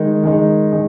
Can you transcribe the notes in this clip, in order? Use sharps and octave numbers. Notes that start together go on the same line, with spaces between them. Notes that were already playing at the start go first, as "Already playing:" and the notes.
Already playing: D#3 G#3 D#4
D#3 G#3 D#4
D#3 G#3 D#4